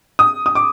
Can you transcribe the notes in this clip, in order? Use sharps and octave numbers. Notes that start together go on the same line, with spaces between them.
D#6
D#6
D6